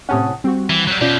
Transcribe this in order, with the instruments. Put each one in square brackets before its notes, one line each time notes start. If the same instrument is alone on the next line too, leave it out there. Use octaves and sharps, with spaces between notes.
[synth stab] A2 C3 C#4 [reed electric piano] F#5 A5 D#6
[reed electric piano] G3 [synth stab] C4 F#4
[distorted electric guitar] E3
F#3 G3
[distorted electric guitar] B2 G4 [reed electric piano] C#4 F4 D5